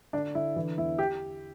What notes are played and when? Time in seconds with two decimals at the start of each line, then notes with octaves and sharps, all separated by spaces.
0.13 D3 D4
0.35 D3 E4
0.56 E3
0.78 E2 E4
0.99 G4